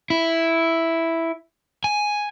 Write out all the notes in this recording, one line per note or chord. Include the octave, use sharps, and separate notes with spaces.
E4
G#5